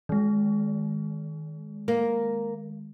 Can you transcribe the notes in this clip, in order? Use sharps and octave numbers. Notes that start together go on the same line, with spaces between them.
D#3 G#3
A#3